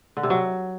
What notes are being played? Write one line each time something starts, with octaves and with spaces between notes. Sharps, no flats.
D3
C3
F#3